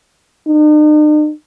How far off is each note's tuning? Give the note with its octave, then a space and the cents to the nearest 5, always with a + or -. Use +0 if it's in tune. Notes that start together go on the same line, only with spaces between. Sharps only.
D#4 -45